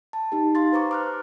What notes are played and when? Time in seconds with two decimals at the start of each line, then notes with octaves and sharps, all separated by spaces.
0.13 A5
0.32 D#4 G4
0.55 F5 C6 A6
0.72 B4 C5 A#5 C#6 D6
0.91 D6 F6 F#6